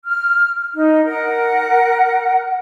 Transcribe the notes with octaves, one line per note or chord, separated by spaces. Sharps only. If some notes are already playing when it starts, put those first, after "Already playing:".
F6
D#4
A#4 F#5